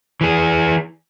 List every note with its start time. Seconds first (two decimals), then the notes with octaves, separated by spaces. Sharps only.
0.21 E3 G#4